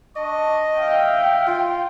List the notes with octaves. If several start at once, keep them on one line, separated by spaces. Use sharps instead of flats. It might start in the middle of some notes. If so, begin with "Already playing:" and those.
D4 D#5 A5 C#6
E5 F5 G5
F4